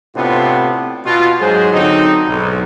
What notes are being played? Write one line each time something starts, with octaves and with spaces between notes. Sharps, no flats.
A2 C3 B3 C4 D4 F4
B2 F4
G#2 F#3 G#3 G#4 C5
D3 F#3 C4 D#4
B1 G#2